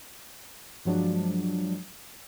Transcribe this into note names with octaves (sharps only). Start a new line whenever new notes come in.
G2 F3 F#3 G#3 D4